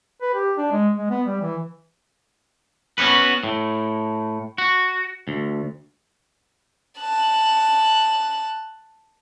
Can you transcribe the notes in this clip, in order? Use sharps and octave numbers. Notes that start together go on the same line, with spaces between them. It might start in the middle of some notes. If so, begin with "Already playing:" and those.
B4
G4
D4
G#3
G#3
B3
G3
E3
B3 C#4 D#4 F#4 B4
A2
F#4
D2
A5 F#6